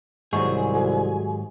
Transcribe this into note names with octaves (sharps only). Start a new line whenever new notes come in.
C2 G#2 D#3 F#3 G#4 C#6
F#4 G4 A4